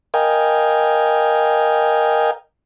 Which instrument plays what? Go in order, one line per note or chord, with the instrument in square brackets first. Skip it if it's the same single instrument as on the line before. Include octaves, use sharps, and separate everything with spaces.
[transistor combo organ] A#4 D#5 F5 G5 G#5